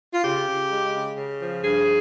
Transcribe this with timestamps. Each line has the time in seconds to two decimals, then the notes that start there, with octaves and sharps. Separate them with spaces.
0.13 F4
0.23 C#3 G4
0.46 C#3
0.70 G#3
0.94 C#3
1.17 C#3
1.41 F3
1.63 G2 G#4